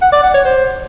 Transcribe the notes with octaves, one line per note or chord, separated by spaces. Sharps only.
F#5
D5
F#5
C#5
C5